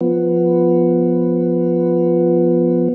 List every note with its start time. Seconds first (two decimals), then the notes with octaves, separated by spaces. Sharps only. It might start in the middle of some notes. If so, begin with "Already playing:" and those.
0.01 F3 B3